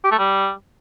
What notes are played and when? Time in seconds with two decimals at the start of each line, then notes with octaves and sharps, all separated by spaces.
0.04 G4
0.11 A3
0.19 G3